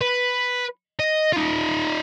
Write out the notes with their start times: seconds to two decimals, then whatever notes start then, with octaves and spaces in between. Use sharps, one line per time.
0.01 B4
1.00 D#5
1.33 D#4 F4